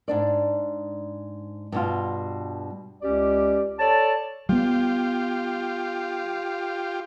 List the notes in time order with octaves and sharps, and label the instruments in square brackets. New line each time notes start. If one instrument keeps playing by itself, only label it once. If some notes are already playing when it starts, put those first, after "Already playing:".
[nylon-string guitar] G#2 D4 D5
G2 B2 F4
[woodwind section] C#2 C#4 G4 D5
A4 C#5 D5 A5
[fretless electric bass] G3 B3 [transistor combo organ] F4 G4